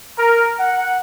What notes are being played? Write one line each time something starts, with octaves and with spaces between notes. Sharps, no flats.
A#4
F#5